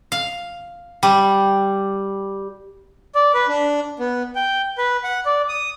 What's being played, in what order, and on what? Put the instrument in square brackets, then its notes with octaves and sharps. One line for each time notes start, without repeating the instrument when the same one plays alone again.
[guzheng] F5
G3
[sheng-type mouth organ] D5
B4
D4
B3
G5
B4
F#5
D5
D#6